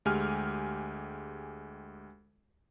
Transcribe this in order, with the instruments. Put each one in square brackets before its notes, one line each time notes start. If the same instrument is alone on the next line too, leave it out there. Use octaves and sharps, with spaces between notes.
[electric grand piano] D2 G#3 G4 G#5 F6